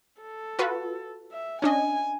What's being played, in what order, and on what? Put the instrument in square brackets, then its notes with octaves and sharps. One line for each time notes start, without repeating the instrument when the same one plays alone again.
[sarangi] A4
[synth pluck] F4 F#4 B4
[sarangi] E5
[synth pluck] C#4 D4 D#5 [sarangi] G#5